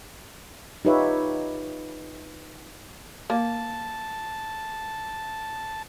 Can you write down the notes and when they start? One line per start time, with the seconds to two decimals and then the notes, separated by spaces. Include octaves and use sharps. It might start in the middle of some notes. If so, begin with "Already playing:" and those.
0.85 D#4 F4 G4 B4 C#5 E5
3.30 A#3 A5